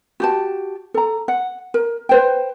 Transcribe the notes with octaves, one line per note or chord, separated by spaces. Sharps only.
F#4 G4 A5
A4 A#5
F#5
A#4
B4 C5 G5